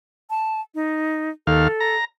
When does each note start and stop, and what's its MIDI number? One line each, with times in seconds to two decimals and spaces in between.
0.30 0.61 81
0.75 1.30 63
1.47 1.68 39
1.47 1.96 69
1.47 1.68 77
1.80 2.05 82